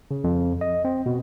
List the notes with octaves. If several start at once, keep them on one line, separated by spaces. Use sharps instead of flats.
C#3
F2
D#5
C4
B2